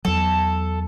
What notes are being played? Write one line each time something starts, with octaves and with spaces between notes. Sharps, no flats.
E2 F#3 A4